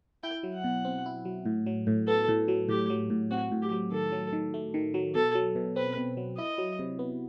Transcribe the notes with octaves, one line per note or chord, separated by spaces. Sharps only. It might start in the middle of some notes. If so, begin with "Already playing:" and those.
E4 G5
F#3
F#5
B2
C4
E4
F#3
A2
F#3
A2
B3 A4
A2
F#3
A2 G4
F#3
A2
C4 F#4
A2
G4
F#3
D#3 A4
F#3
D#3
A3
D#3
F#3
B2 A4
F#3
B2
C4 B4
B2
F#3
E4 D#5
F#3
C3
B3